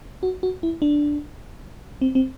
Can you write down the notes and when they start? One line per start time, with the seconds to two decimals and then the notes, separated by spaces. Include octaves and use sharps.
0.23 F#4
0.43 F#4
0.63 E4
0.82 D4
2.01 C4
2.15 C4